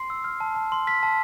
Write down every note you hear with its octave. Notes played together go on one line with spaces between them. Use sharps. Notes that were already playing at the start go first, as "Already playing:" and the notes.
Already playing: C6 C7
E6
F6
A5
A5
C6
F6 B6
A5